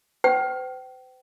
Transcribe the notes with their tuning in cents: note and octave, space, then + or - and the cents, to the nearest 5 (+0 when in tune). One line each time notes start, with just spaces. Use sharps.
C5 -45 G5 -30